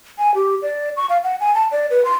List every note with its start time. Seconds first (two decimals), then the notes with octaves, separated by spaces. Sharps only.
0.19 G#5
0.35 G4
0.62 D5
0.97 C#6
1.10 F5
1.24 F#5
1.41 G#5
1.55 A5
1.72 D5
1.90 B4
2.05 C6